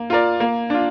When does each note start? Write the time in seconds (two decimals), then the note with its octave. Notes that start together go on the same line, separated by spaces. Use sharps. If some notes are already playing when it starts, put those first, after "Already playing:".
Already playing: A#3
0.10 F4 A#4 D5
0.40 A#3
0.70 D4 F4